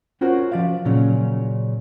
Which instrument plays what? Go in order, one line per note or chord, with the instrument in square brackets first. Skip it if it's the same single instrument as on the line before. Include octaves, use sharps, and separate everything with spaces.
[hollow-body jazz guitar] C#4 F4 F#4 A#4 C5 C#5
F3 D5 F5
A#2 C#3 F#3 C#4